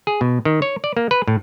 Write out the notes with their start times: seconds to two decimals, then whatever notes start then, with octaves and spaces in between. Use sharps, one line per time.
0.07 G#4
0.21 B2
0.45 D#3
0.62 C#5
0.84 D5
0.97 A#3
1.11 B4
1.28 A2